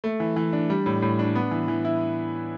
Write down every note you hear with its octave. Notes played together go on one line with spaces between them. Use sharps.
A3
E3
E3
D4
G3
A2
A2
D4
B3
E3
E3
E4